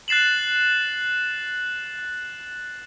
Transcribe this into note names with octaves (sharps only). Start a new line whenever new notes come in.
F#6 A6 C7 E7 F#7